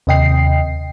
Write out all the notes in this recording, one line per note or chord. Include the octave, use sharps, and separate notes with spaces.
D#2 C3 D#5 G5 C7